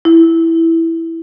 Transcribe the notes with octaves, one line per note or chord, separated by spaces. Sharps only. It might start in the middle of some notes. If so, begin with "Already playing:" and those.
E4